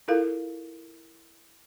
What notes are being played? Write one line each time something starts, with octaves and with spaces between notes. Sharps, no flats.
E4 F4 A4 A#4 F5